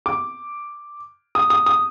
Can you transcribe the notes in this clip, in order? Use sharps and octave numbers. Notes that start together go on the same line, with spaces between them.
D6
D#6
D#6
D#6